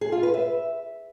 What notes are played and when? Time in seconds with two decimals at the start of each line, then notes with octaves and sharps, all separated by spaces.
0.01 G#4
0.12 F4
0.23 B4
0.34 E5